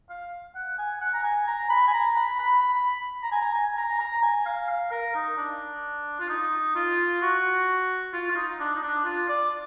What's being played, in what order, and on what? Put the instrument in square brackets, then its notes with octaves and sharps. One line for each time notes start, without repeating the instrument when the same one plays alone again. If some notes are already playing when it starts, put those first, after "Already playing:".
[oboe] F5
F#5
G#5
F#5
A#5
G#5
A#5
B5
G#5
A#5
B5
B5
B5
A#5
G#5
A#5
G#5
A#5
A#5
G#5
F5
F5
A#4
D#4
D4
F4
D#4
F4
F#4
F4
F4
D#4
D4
D#4
D4
F4
D5